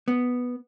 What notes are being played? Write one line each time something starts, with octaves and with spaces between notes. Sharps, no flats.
B3